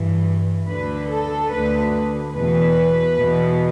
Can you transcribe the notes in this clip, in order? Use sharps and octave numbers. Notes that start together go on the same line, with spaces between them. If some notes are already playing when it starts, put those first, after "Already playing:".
Already playing: G2 E3
D2 D3 B4
A4
D2 D3 B4
E2 B2 B4
E2 B2